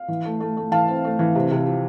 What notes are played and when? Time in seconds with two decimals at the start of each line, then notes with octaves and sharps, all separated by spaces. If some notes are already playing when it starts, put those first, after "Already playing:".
Already playing: F5
0.08 E3
0.25 A3
0.40 A3
0.57 A3
0.72 E3 F5 A5
0.88 C4
1.04 A3
1.19 E3
1.35 C3
1.51 C3
1.67 F3